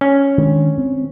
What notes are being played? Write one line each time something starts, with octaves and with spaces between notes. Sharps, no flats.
C#4
D#3 G#3 D4
C4